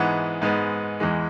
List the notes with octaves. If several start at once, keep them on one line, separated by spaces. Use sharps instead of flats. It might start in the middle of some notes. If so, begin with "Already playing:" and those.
Already playing: G#2 E3 G#3 B3 F#5
G#2 G#3 B3
E2 E3 G#3